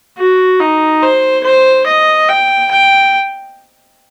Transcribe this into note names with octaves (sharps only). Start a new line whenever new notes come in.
F#4
D#4
C5
C5
D#5
G5
G5